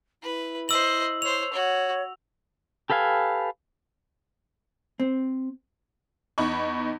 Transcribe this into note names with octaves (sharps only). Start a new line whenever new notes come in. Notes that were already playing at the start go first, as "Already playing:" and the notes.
E4 B4
C5 D#5 E6 F#7
C5 C#5 F7
F#4 C#5
G4 A4 B4 F5 G#5
C4
E2 D#4 B5 C#6